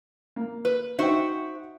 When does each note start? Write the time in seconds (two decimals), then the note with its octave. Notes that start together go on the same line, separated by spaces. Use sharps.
0.36 A#3
0.65 B4
0.99 D#4 F#4 C5 E5 G5